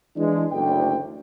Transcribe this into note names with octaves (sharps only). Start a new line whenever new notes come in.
E3 G#3 D4
F#1 D2 G5